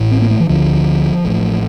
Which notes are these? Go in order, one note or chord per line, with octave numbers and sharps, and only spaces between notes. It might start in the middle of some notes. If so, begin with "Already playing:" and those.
Already playing: A1 A2
C4
A#3
A3
E3
D2 D3 F3
A1 A2